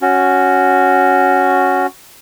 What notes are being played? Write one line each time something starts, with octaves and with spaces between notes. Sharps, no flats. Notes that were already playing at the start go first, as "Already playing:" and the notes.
C#4 F#4